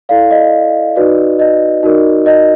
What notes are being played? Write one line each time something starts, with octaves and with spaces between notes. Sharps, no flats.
E4 A4 D5 F5
D#5
D#4 F#4 B4 D5
D#5
D#4 F#4 A#4 D5
D#5